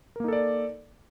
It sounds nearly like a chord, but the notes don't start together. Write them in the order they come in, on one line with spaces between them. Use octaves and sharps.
A#4 A#3 D#4 A4 D5